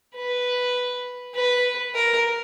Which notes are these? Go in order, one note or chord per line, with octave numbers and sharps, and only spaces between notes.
B4
B4
A#4